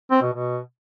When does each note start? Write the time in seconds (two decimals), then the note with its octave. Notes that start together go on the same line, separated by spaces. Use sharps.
0.11 C4
0.22 B2
0.33 B2